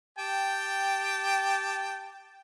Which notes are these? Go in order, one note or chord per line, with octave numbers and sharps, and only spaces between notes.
G4 G5 A5